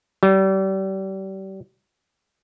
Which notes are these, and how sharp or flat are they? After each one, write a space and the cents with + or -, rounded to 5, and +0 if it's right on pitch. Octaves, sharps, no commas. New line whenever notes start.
G3 -35